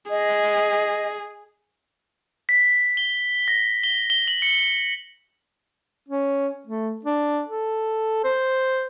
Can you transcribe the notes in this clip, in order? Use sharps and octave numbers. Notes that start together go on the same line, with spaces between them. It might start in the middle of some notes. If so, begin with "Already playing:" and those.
G#4 D#5
B6
G7
A#6
G7
G7
F#7
C#7
C#4
A3
D4
A4
C5